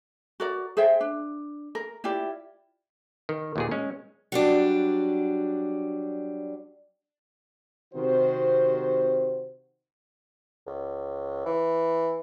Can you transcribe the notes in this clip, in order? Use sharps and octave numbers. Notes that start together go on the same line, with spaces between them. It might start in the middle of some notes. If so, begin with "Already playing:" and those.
F#4 A#4 D5
G#4 C5 E5 G5
D4
A#4
E4 F4 G4 D5
D#3
D#2 A#2 G#4
G#3 C#4
F#3 G3 D4
C3 D#3 F#4 C5
C#2
E3